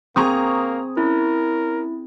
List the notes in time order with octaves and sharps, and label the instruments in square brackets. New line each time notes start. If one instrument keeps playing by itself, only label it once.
[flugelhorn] A#3 [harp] C4 G#4 [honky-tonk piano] A#5 C#6 D#6
[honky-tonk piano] C#4 [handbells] E4 [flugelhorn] A#4